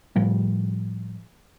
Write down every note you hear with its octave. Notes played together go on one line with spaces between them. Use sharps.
A2 F3 G3